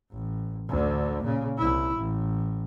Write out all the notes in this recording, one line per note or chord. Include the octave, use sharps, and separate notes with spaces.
A1
D2 D3
A#2 C#3
C2 E4
A1